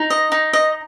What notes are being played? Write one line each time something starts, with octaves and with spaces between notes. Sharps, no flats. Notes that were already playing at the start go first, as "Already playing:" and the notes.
Already playing: D#4
D#5
D#4
D#5